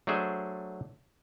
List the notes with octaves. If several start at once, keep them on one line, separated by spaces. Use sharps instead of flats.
F#3 A3 D4 G#4 C5